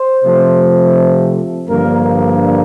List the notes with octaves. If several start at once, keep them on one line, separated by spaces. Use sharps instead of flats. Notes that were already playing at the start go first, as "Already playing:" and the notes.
Already playing: C5
C3 F3 A3
G2 D3 F3 A#3 A#4